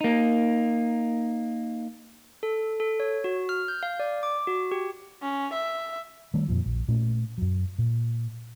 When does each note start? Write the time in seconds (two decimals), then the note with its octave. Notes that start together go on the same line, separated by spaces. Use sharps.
0.01 A#3 D#4
2.43 A4
2.80 A4
3.00 C#5
3.24 F#4
3.49 F6
3.68 G6
3.83 F5
4.00 D5
4.23 D6
4.47 F#4
4.71 G4
5.22 C#4
5.53 E5
6.34 D#3 G3 A3
6.48 F2 A#2 F3
6.66 A#1
6.88 A#2 A3 C#4
7.38 F#2 F#3
7.78 A#2